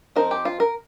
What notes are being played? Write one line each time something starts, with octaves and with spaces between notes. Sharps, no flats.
F3 C4 D#4 A#4
G4
F4
A#4